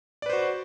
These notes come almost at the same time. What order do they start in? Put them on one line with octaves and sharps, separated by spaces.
D5 B4 C5 F#4